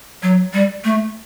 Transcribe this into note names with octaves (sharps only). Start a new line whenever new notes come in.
F#3
G3
A3